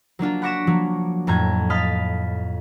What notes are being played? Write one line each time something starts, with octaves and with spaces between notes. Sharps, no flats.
F#3 A#3 D4 F4
F#5 B5 C#6 D6 A#6 E7
F3 F#3 A#3
F2 A2 A#5 G#6
D#5 F5 B5 F6 A6